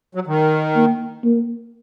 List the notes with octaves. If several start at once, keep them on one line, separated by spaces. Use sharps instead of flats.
F#3
D#3
A#3
A#3